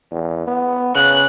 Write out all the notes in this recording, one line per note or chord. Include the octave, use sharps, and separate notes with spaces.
E2
B3
C#3 F#6